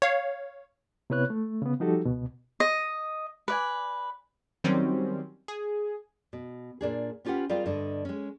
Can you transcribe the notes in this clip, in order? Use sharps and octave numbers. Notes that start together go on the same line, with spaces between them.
C#5 F5
C3 B3 E4 B4 C#5 F#6
A3
C#3 B3
F3 G3 D#4 F#4 G4 A4
C#2 B2
D#5
B4 D5 G#5
D#3 F#3 G3 C4 C#4
G#4
B2
A#2 D4 G#4
B3 C#4 F4 G4 B4 F#5
G3 C4 F4 G#4 A#4 F5
G2 D3 D#5
G#3 C#4